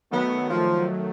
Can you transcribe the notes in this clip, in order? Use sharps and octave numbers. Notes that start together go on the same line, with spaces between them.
D#3 F#3 A3 B3
F3